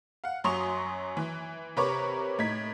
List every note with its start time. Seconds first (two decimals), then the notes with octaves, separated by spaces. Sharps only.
0.24 F5 F#5
0.44 F#2 F#3 C6 C#6 D#6 F7
1.17 E3
1.77 C3 A#4 B4 C#5 C#6 D6
2.39 A2 D#4 G#6 B6